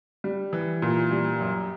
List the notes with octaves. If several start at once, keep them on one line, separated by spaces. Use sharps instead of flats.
G3
E3
A#2
G3
F#2